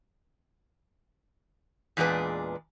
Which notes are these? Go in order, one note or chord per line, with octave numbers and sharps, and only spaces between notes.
E2 A#2 G#3 D4 B4